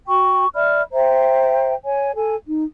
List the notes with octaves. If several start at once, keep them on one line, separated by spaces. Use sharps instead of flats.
F#4 G5 C#6
D5 E5 B5 F6
C5 E5 G5 A#5
C#5 G#5
A4 G#5
D#4